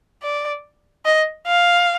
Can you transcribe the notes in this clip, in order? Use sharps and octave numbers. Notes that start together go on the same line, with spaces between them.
D5
D#5
F5